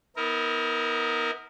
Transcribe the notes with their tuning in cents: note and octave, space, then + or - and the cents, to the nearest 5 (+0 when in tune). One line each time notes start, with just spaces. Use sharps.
B3 +0 D#4 +45 A#4 -5